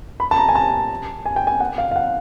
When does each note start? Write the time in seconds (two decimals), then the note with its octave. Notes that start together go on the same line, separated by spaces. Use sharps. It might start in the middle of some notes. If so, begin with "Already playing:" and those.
0.20 B5
0.31 A5
0.38 A#5
0.49 G#5
0.55 A5
1.26 G#5
1.36 G5
1.47 G#5
1.60 F#5
1.78 F5
1.91 F5
1.96 F#5